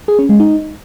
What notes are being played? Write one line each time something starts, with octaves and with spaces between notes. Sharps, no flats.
G#4
C#4
G#3
D#4